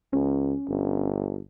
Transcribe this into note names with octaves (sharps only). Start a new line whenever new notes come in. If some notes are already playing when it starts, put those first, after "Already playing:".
C#2 C#4
G1